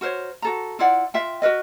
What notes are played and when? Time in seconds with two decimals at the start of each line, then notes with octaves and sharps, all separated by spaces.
0.01 F#4 A#4 C5 C#5
0.42 F#4 A4 A#5
0.79 E4 F4 D5 F#5
1.14 F4 E5 G5
1.42 F#4 A#4 B4 D#5